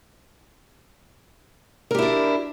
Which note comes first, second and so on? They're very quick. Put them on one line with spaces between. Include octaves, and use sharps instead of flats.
A#4 G4 E4 D4